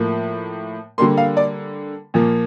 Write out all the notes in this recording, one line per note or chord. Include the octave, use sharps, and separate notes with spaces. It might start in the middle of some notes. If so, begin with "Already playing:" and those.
Already playing: A2 F3 A#3
D3 G3 A#3 C6
F5
D5
A#2 F3 A#3